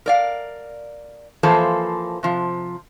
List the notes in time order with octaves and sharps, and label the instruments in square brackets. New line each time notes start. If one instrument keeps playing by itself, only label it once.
[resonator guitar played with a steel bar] A#4 D5 F5
E3 F3 A#3 A4 C5
C3 F3